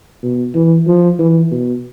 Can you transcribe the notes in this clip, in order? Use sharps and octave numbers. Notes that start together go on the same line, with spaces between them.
B2
E3
F3
E3
B2